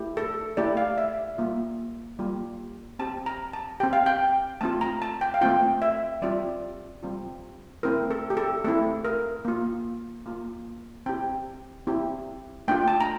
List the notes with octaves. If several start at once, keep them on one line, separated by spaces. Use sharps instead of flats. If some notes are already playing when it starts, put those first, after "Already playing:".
Already playing: A3 E4 G4
A4
A3 E4 G4 D5
F5
E5
G3 A#3 F4
G3 A#3 F4
C4 G4 A5
A#5
A5
C4 G4 G5
F5
G5
A3 C4 F4 A5
A#5
A5
G5
F5
A3 C4 F4 G5
E5
G3 C4 F4 D5
G3 C4 F4
A3 C4 E4 A#4
A4
G4
A4
A3 C4 E4 A4
A#4
A#3 F4
A#3 F4
C4 E4 G4 G5
C4 E4 G4
A3 D4 F4 G5
A5
A#5